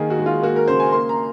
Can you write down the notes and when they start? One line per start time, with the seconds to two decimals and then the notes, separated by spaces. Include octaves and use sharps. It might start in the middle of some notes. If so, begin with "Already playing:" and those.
Already playing: D#3 A#3 G#4
0.10 F#4
0.18 G#3
0.26 F4
0.43 A#3 F#4
0.56 A#4
0.68 C#3 C5
0.80 G#5
0.92 A#3 C6
1.09 A#5